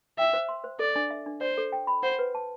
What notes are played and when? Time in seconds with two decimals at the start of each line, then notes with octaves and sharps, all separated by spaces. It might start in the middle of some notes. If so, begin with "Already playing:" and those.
0.18 E5 G5
0.34 C5
0.49 C6
0.64 C5
0.79 A4 D5
0.96 D4
1.11 E5
1.26 D4
1.41 C5 D5
1.58 A4
1.72 G5
1.87 B5
2.03 C5 F#5
2.19 B4
2.35 A5